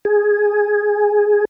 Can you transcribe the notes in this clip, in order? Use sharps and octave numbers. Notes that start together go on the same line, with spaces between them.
G#4